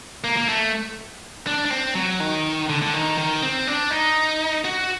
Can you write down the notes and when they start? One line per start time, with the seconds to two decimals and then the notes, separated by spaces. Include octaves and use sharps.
0.24 A#3
0.37 A#3
0.49 A3
1.47 D4
1.65 D4
1.70 C4
1.95 F#3
2.20 D#3
2.69 D3
2.82 D3
2.94 D#3
3.18 D#3
3.42 C4
3.67 D4
3.91 D#4
4.65 F#4